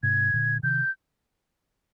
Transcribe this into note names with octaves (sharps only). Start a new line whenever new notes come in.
G#2 C3 G#6
A#2 D3
C3 D#3 G6